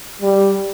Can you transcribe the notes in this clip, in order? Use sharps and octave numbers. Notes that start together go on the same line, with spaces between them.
G3